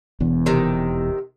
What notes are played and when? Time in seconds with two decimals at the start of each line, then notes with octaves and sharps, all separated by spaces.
0.20 E1 E2
0.46 C3 D#3